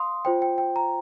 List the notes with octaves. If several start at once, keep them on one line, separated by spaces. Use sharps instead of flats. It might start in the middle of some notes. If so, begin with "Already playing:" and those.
Already playing: F5 C6 D#6
F4 C5 G5
G5
G5
A#5